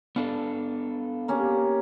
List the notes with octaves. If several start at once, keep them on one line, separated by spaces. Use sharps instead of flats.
B3 D4 A4 F5
A#3 C#4 G4